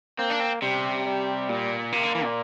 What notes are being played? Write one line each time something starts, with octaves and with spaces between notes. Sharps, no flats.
A#3 C4
D4
C4
C3 G3
G3
A#2
C3 A#3
D3
E3
A#2